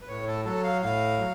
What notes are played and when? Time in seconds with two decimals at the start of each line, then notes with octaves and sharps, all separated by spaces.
0.01 B4
0.08 A2 C#5
0.27 A4
0.45 F#3 A4
0.64 F5
0.82 A2 F5
1.18 F#3